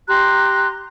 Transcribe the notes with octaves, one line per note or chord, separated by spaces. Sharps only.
G4 A#5 C6 F#6